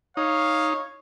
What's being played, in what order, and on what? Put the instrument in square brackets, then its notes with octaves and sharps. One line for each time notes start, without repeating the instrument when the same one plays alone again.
[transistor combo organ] D#4 [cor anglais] C#5 [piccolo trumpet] F5